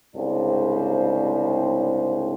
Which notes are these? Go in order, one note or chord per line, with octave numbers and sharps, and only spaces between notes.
C2 G#2 C#3 D4 C5